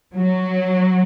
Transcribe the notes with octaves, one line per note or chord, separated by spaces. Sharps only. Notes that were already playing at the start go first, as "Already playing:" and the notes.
F#3